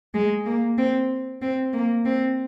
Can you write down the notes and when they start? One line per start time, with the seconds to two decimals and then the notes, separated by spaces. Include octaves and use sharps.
0.14 G#3
0.46 A#3
0.78 C4
1.42 C4
1.73 A#3
2.05 C4